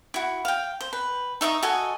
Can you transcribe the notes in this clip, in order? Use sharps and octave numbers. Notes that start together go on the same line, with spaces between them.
E4 F#4
F5 G5
C5
B4
D#4 E5 C#6 D#6
F#4 A4 D#5 G#5